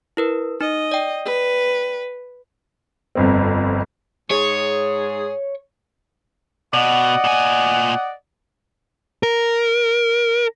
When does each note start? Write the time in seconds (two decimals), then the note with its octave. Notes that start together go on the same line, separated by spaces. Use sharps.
0.17 E4 A#4 B4
0.61 D#4 D#5
0.92 D5 G5
1.26 B4
3.15 G1 F2 C4
4.31 G#2 G#4 C#5
6.74 B2 D5 D#5 F#5
7.25 A#2 G#5
9.23 A#4